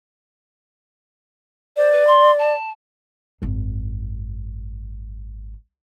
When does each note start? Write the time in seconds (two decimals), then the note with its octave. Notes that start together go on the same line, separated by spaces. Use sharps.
1.77 C5 D5
1.92 B4
2.07 C6
2.39 A5
3.42 G#1 F#2